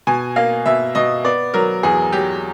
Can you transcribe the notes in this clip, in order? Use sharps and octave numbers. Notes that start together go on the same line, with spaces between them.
B2 G#5
A#3 F5
B2 E5
B2 D#5
B3 D5
F#3 A#4
E2 G#4
F#3 G4